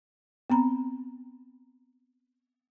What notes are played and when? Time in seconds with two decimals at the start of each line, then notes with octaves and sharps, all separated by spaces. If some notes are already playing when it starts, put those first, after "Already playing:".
0.50 B3 C4 A#5 B5